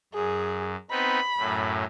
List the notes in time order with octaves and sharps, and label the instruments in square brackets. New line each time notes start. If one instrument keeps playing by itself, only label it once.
[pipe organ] F#2 [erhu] G#4
[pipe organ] B3 C4 D#4 [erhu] B5
[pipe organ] F#2 A2